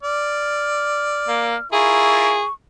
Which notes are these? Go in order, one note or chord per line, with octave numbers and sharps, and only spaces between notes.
D5 F6
A#3
E4 F4 G#4 A#4 C#6